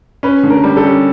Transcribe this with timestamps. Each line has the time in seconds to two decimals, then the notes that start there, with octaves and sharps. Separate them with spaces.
0.23 C#4 B4
0.43 D3
0.50 A#4
0.64 G3
0.77 A4
0.84 C#4